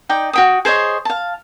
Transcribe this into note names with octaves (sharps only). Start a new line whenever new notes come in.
D#4 D5 G5
F#4 G5 D#6
G#4 C5 C#5 D#5
F5 A5